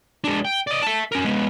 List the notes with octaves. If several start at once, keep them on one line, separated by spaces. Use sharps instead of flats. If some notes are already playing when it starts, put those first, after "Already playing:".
G#3 D4
G5
D5 D#5
E5 A5
C#4 A#4
G#3 B3